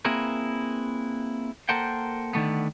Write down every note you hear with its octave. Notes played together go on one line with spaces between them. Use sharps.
A#3 C4 E4 G#4 A#4 B4
A#3 A4 A#4 C5 F#5 G5
D3 D#3 A3 B3